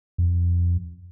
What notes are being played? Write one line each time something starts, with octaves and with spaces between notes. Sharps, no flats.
F2